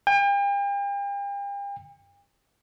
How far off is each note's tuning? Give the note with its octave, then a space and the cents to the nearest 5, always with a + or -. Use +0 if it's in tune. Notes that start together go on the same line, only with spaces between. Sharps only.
G5 +40